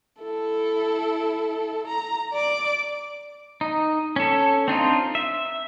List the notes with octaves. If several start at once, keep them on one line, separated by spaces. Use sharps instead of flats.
E4 A4
A#5
D5 D6
D#4
C#4 A4
C4 D4 D#4 F4
E5